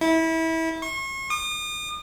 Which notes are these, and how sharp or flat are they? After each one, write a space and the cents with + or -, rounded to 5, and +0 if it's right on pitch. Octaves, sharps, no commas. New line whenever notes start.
E4 -25
C#6 -40
D#6 -40